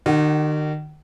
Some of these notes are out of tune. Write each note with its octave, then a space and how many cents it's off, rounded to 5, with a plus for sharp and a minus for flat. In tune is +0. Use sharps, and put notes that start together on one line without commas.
D#3 -35 F#4 +45 F#5 +0